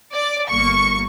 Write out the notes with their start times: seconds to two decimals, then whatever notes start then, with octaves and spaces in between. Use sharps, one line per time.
0.13 D5
0.49 G1 A#3 C#6